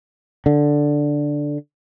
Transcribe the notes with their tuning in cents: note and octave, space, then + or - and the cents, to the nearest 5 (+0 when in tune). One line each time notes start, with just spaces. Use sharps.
D3 +0